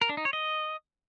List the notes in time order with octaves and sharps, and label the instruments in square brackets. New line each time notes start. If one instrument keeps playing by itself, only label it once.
[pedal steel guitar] A#4
D4
D#4
C#5
D#5